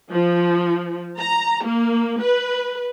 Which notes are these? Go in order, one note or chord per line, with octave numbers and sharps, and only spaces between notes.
F3
A#5
A#3
B4